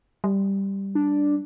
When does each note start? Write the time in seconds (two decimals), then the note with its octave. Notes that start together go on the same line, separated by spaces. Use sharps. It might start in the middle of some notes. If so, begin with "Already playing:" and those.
0.24 G3
0.95 D4